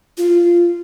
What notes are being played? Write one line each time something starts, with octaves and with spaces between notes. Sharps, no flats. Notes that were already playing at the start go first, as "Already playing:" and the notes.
F4